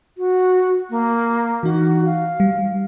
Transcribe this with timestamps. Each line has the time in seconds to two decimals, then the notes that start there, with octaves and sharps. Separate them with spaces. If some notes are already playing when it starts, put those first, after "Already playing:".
0.18 F#4
0.90 A#3
1.63 E3 D#4 F#4
2.05 F5
2.40 G3